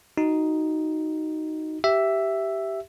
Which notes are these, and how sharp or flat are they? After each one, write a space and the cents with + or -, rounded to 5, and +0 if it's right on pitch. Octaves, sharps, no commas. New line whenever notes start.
D#4 +0 F#4 +10
G4 -10 E5 +5